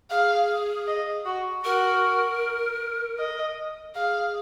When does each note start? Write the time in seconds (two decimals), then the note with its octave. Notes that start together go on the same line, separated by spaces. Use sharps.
0.10 G#4 F5
0.87 D#5
1.25 F#4
1.64 F#4 A#4
3.19 D#5
3.94 G#4 F5